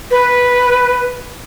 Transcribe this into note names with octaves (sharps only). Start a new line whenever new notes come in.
B4